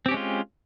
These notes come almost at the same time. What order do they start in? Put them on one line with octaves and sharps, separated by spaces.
C4 G4 C#4 G#3 F4